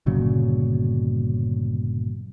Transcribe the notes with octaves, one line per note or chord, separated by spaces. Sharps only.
G1 A#2 C#3 F#3